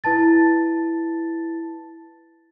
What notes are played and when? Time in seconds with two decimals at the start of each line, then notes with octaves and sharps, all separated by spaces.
0.04 E4 B4 A5 A6